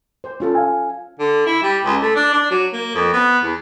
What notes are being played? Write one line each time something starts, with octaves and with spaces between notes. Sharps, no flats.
C5
C#4 F4 A4
F5 G#5
D3
E4
G3
C#2
A3
D4
D4
F#3
A#3
F2
B3
E2